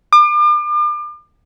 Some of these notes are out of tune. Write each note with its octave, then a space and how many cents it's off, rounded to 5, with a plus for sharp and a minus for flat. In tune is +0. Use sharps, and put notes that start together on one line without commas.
D6 +40